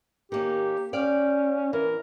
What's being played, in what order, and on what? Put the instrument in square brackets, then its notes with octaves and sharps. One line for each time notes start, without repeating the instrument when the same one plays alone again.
[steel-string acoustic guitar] D#3 A#3 C#4 [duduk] G4
[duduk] C#4 [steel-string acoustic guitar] D5 F5 G5
[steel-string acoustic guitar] E3 [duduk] A#4